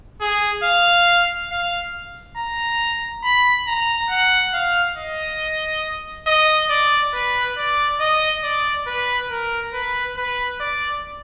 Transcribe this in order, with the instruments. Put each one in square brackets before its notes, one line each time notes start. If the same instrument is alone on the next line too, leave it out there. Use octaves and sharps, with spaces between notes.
[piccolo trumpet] G#4
F5
F5
A#5
B5
A#5
F#5
F5
D#5
D#5
D5
B4
D5
D#5
D5
B4
A#4
B4
B4
D5